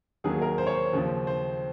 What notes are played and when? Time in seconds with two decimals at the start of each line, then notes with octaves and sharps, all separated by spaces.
0.24 D#2 D#3 F#3 A#3 G#4
0.42 A#4
0.58 C5
0.67 C#5
0.75 C5
0.93 D#2 C#3 F3
1.27 C5